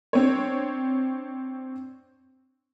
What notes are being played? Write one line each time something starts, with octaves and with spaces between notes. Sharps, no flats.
C4 D4 C#5